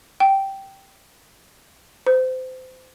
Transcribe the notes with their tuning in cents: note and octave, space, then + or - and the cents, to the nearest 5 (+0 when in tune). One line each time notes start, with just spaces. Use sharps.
G5 -10
C5 -25